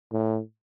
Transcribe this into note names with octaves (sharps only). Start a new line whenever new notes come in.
A2